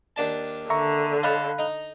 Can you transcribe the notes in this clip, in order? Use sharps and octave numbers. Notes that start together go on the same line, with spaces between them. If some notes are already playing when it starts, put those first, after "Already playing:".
D#2 D4 A5
D3 E5 A#5 C#6
C#5 D#5 F5 A5 B5 F#6
D#4